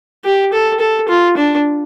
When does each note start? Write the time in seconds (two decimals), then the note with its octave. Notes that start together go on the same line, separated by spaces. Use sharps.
0.25 G4
0.53 A4
0.80 A4
1.08 F4
1.37 D4